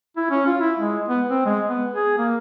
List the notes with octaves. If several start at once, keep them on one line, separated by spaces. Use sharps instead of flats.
E4
C#4
F4
E4
G#3
B3
C4
G#3
B3
G#4
A#3